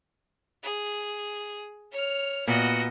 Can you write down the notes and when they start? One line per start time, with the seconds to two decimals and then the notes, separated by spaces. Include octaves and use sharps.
0.63 G#4
1.92 C#5 F6
2.47 A#2 B3 F#4 D#5